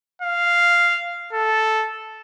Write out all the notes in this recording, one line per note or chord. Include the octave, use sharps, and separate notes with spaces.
F5
A4